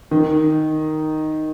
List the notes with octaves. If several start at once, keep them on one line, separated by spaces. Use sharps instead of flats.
D#3